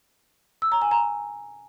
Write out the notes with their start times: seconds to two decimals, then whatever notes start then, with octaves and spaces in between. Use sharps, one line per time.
0.62 E6
0.72 A#5
0.82 G#5
0.91 A#5